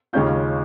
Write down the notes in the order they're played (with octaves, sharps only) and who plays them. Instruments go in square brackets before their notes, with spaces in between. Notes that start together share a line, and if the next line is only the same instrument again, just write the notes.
[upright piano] D#2 C#3 G#3 C#4 F4 G6